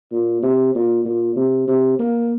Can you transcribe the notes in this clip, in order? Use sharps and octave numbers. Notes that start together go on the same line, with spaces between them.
A#2
C3
A#2
A#2
C3
C3
A#3